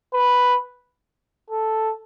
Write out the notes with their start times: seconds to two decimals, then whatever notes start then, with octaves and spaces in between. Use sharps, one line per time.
0.14 B4
1.50 A4